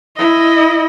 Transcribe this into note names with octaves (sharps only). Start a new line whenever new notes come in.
E4 D#5